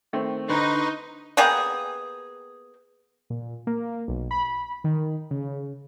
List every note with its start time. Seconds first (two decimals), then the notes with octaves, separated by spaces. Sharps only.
0.13 D#3 A3 C4
0.49 D3 D#4 B4 C6 C#6
1.37 A#3 B3 G4 G#4
3.30 A#2
3.67 A#3
4.08 B1
4.31 B5
4.84 D#3
5.31 C#3